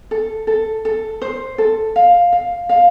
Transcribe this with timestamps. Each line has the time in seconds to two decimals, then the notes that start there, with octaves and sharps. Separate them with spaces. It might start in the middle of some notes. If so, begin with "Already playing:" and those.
0.11 A4
0.47 A4
0.85 A4
1.22 C5
1.58 A4
1.96 F5
2.33 F5
2.69 F5